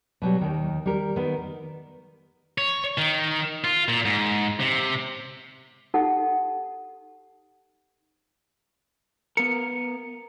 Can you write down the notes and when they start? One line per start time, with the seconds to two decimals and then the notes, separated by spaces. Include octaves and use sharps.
0.22 B2 F#3 G3
0.41 D#2 D#3
0.86 G3 A#4
1.16 D#3 B3
2.58 C#5
2.98 D#3
3.64 F4
3.89 A#2
4.05 G#2
4.60 C3
5.94 D#4 G4 A4 F#5
9.37 B3 A#4 C#7